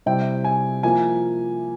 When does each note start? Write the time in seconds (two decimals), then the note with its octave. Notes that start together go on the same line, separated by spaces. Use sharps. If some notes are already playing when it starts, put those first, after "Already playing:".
0.06 C3 G3 C4 E4 G5
0.44 G#5
0.83 F3 A#3 E4 G#5